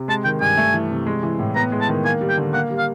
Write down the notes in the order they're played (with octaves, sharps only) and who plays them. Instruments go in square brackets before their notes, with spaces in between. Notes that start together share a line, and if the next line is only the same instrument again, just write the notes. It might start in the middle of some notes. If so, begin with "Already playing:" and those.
Already playing: [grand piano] C3
[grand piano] G#3 [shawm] A5
[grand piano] D#3 [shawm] G5
[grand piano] G2 [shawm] G#5
[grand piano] A3
E3
C3
G#3
E3
A2
[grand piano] B3 [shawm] A#5
[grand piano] G#3
[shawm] A5
[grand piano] D#3
[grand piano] A#3 [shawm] G#5
[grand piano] G3
[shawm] G5
[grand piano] D3
[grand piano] A#3 [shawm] F#5
[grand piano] G3
[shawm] F5